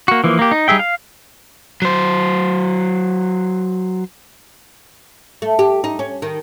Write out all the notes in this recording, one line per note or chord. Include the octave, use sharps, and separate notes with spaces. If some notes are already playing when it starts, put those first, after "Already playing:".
A#3 F#4
E3 F3 A#3
A#3 G4
D#4
G3 D#4 G#4 E5 G5
F5
F#3 C5
A3
G4
D#4
C#4
D#3